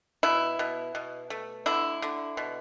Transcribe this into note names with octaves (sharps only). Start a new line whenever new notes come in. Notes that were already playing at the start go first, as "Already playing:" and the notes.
B2 E4
B2
B2
A3
D3 E4
D3
B2